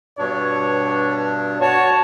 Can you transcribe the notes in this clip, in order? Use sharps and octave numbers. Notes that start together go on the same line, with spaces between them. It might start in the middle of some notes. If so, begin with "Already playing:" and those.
G2 B2 D4 C#5
F#4 C#5 A5